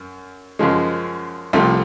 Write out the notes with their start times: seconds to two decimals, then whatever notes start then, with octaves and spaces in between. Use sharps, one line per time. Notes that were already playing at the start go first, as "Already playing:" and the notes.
Already playing: F#2
0.59 F#2 C#3 F3 G#3
1.53 C2 C3 F3 A3